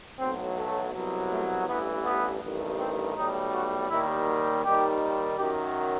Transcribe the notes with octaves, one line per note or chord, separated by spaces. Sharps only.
B1 A2 F#3 C4
A3
C2 B2 F#3
A3
A1 G2 E3 B3
B3
A1 G2 D#3
C4
B1 A2 G3 D#4
F#4
D#2 D#3 G3 E4
F#4
D#2 D#3 G3 G4
F#2 D#3 F#3 G4